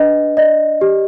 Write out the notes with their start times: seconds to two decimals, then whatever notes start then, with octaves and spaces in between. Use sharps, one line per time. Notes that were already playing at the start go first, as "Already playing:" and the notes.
Already playing: D4 B4 D#5
0.37 D5 D#5
0.81 G4